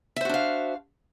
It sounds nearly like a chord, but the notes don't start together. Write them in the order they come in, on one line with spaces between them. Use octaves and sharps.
E5 C5 F#4 D4 F5